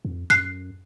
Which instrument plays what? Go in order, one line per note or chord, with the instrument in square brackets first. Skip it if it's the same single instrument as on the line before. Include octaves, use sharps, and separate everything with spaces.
[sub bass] F2
[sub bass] F#2 [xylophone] F#6 C7